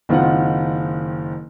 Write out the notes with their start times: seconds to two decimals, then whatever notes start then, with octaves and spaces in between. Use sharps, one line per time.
0.09 F#1 D#3 C4 F4 F#5